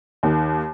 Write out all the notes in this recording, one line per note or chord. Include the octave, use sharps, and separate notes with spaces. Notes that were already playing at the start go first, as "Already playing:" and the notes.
D#2 D#3